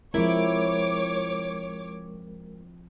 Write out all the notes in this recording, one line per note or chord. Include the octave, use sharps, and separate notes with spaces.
F3 G#3 C4 E4 A#4 C#5 D6